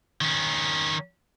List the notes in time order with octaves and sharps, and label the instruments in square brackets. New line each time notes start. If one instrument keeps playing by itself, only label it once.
[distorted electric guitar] D#3 C#4